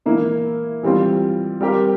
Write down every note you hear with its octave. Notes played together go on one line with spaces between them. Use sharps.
E3 A#3 E4
E3 G3 C4 F4
G3 C4 G4 A#4